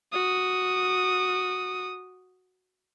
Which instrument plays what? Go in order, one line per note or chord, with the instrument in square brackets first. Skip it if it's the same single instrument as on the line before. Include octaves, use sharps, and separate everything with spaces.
[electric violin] F#4 D#6